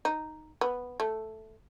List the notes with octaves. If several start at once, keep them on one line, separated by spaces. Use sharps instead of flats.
D#4
B3
A3